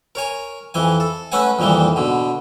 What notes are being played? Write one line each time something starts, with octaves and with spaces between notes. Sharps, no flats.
A#4 C#5 G#5
F2 E3 G#5
A4
A3 C#4 B4 E5 F#5 G#5
F2 A#2 D#3 E3 G3
B2 D3